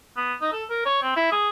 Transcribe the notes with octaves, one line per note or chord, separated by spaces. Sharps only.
B3
D#4
A4
A#4
C#5
C4
E4
G#4